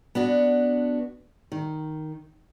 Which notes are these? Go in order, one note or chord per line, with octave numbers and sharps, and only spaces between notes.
B3 D4 F#4
D#3